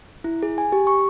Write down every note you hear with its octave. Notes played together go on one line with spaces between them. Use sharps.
E4
G#4
G#5
G4
C#6